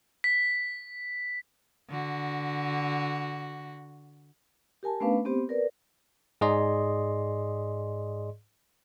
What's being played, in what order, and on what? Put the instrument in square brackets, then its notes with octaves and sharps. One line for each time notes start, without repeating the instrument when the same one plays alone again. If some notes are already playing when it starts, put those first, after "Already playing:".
[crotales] B6
[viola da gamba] D3 F#4
[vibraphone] G4 A#4 G#5 A5
A3 B3 C#4 D4 B4 F5
B3 C4 G4 C5
A#4 B4 D5
[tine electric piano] G#2 G#4 D5 D#5 C6